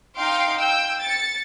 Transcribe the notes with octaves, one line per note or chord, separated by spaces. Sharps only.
D#4 F5 G5 C6 D7
G5 E6
A6 C#7